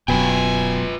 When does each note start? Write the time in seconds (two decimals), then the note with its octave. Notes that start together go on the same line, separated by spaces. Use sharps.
0.08 D1 F#2 B2 F4 B4 G5 G#5